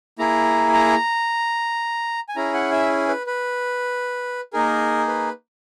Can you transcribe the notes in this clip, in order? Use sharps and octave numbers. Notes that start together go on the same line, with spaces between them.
A#3 E4 G#4 A#5
A#5
G#5
C#4 E4 G#4 A#5
F#5
E5
B4
B4
A#3 D#4 G#4 A#4
B4